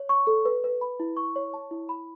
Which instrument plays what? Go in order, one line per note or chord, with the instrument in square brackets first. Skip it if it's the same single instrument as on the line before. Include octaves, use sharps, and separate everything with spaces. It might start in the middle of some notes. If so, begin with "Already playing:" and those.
Already playing: [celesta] C#5
C#6
A4
B4
B4
B5
E4
C#6
C#5
A5
E4
B5